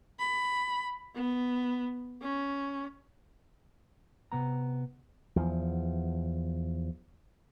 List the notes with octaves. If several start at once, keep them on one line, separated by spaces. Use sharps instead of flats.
B5
B3
C#4
C3 B3 A#5
E2 F3